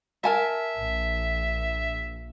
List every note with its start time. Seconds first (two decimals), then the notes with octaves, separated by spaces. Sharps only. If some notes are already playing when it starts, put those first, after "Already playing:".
0.24 A#4 E5 G#5 A5
0.76 A#1